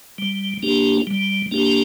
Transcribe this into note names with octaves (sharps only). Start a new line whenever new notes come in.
G3
A#3 D4 G4
G3
A#3 D4 G4